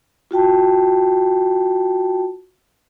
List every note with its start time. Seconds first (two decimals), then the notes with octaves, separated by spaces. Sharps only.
0.31 F4 F#4 G5 A5